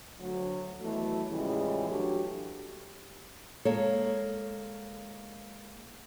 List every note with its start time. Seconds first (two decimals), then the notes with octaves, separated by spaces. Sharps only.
0.19 D2 F#3
0.80 D#2 B2 E3 F#3 A3
1.30 A2 C#3 E3 F3 G3 G#3
1.89 F#3 A3 D4 F#4 G4
3.65 G#3 A#3 A4 C#5